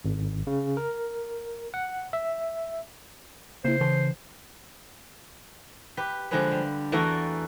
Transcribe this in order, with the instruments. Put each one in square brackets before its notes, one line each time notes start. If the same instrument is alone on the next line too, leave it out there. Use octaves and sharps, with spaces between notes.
[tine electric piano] G#1
C#3
A#4
F#5
E5
[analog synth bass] C#3 [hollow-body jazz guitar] A#3 E4 [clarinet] C5
[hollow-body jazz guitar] C#3 A5 C6 [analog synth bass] E3
[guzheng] G4 B4
D3 F3 G#3 D4 G#4 B4
G3
E2 E3 A3 F#4 A4 A#5